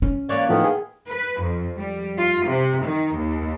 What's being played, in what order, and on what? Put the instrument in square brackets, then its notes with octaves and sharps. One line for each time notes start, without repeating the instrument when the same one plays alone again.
[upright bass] C#4
[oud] E3 A#3 [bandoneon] C#5 D5
[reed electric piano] A2 F3 A3 [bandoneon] D#3 B3
[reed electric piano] G#4
[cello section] B4
F2
G3
F4
C3
D#3
D#2